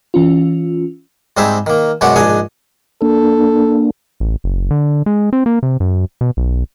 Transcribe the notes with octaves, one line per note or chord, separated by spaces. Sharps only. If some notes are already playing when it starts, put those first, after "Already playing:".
E3 C#4 F4
G#2 G3 C4 D#4 G#4 E5
D#3 A#3
F#2 B2 G#3 F#4 D5 F#5
A#1 G#2 D4 D#5 G#5 D#6
A#3 D4 A4
A1
F#1
D3
G#3
C4
A#3
C3
F#2
B2
B1